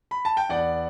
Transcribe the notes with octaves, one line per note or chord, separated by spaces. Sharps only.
B5
A5
G5
E2 D5 F#5